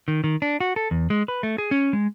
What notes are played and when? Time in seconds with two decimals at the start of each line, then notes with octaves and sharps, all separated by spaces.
0.08 D#3
0.24 D#3
0.42 D4
0.61 F#4
0.76 A4
0.91 E2
1.10 G#3
1.28 B4
1.43 A3
1.58 G#4
1.71 C#4
1.93 G#3